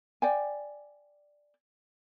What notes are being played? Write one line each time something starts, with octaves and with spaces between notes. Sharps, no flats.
D5 G5 G#5